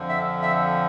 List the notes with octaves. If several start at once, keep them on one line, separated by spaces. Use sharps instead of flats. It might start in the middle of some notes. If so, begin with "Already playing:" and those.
Already playing: F2 D3 F3
E5
E5